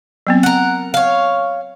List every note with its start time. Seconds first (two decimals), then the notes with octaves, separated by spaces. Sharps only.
0.27 F#3 B3 C4
0.43 A#4 F#5
0.94 C#5 F5